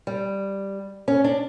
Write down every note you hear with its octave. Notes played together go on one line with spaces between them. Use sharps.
G3
C#4
D4